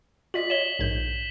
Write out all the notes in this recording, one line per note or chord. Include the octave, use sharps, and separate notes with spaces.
F4 D5 D#5 B6 F#7
C#5 D#5 E7 G7
A#1 G#2 G6